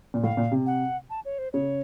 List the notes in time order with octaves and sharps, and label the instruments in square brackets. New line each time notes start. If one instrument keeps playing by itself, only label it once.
[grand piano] A#2
[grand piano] A2 [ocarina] F5
[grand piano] A#2
C3
[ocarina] F#5
A5
C#5
C5
[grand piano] C#3 [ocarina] C#5